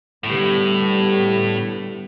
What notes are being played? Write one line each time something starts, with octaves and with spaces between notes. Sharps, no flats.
A2 D3 G3 B3